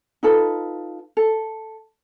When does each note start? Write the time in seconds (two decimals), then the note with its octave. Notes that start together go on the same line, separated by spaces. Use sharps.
0.23 D#4 F4 A4 B4
1.17 A4